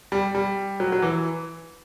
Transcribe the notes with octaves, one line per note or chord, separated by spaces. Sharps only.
G3
G3
F#3
F#3
E3